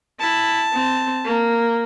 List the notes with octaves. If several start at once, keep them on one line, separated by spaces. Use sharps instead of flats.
E4 A5
C4
A#3